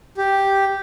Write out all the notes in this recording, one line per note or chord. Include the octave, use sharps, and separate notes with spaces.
G4